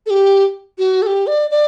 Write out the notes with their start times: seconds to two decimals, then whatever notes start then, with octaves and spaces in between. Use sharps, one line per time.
0.06 A4
0.10 G4
0.78 F#4
1.02 A4
1.07 G4
1.27 D5
1.51 D5